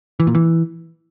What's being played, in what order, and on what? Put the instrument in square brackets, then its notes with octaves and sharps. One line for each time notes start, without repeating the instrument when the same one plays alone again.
[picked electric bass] E3
A#2
E3